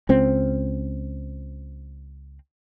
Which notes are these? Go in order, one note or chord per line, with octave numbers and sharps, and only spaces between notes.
C#2 C4